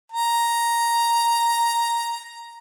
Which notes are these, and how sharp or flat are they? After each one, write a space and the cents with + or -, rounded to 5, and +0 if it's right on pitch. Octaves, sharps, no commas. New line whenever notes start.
A#5 +5